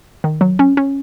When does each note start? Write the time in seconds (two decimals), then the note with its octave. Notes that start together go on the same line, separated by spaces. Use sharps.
0.24 D#3
0.41 F#3
0.59 C#4
0.77 C#4